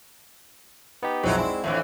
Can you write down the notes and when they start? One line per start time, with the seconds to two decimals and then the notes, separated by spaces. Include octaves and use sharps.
1.03 B3 D#4 G4
1.23 B1 F2 F#3 G#3 C4 D#4 E4
1.37 E4 D5 G#5 C6
1.64 F2 A2 E3 D4 E5